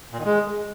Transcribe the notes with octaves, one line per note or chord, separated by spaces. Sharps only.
A#2
D#3
G#3